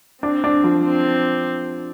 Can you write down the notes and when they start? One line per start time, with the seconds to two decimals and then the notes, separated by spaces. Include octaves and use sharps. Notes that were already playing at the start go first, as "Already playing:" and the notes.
0.23 C4 D4
0.44 D4
0.64 F3
0.84 C4